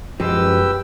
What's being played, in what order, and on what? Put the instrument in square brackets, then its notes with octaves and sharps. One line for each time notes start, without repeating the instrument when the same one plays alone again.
[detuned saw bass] F#2 [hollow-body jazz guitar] F3 G#3 B3 [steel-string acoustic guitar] G4 [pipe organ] B4 G5 E6